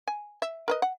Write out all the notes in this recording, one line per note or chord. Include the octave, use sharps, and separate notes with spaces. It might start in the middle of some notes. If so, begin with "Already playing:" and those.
G#5
E5
A#4 B4 D#5
F#5